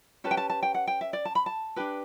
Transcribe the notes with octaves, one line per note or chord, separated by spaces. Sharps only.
C#4 G4 B4 A5
G5
A5
A5
G5
F#5
G5
E5
D5
A5
B5
A5
D4 G4 B4